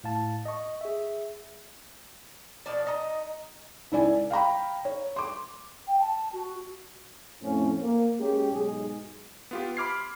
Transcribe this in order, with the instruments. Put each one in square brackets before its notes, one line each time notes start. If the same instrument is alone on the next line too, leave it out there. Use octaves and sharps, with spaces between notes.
[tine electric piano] A2 F5 A5
D#5 C#6
G#4 E5
[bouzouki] B2 F3 D4 D5
D#4 D#5 A#5
[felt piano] C#2 E4 D5 G#5
F5 G5 A#5 B5
C#5
C6 D6
[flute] G5
A5
F#4
[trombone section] F2 A2 F3 A3 C#4
A#3
G#3 C#4 G4
B1 G#2 G#3 D#4 G#4
[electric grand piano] B3 F4 G4
B5 C6 D6 F6 G#6 C7